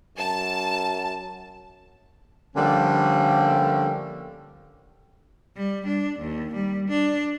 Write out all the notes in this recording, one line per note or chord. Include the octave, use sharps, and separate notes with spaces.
F#2 A5
D3 F3 G3 A3 A#3 C#4
G3
D4
D#2
G3
D4